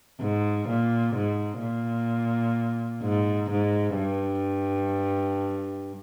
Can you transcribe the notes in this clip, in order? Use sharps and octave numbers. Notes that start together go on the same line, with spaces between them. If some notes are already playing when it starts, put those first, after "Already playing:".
G#2
A#2
G#2
A#2
G#2
G#2
G2